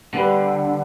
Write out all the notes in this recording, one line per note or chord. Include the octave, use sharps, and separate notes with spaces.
D3 G3 B3 D4 G4 B4